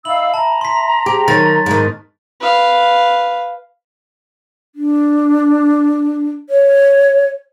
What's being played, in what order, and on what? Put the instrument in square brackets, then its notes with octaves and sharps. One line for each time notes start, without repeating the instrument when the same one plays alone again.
[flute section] D#4 F5 E6 [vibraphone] E5 B5 [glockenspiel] F#7
[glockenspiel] A5 [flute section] A#5
[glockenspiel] C6 B6
[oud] G4 [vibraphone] G#4 C5 G5
[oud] D#3 [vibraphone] F#3 C#5 C#6 [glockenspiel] A6
[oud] G#2 D#3 [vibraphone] B3
[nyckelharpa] B4 F5
[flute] D4
C#5